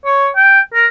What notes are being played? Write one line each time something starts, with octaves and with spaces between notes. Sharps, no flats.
C#5
G5
A#4